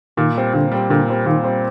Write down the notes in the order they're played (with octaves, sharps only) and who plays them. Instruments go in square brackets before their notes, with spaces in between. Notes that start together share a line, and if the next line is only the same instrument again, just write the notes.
[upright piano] A#2 [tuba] D#3
[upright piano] G3 C4
[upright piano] A#2 [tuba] D3
[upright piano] G3 C4
[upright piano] A#2 [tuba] D3
[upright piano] G3 C4
[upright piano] A#2 [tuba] D#3
[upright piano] G3 C4